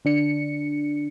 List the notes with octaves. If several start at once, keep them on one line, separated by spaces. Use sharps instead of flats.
D3 D4 C#7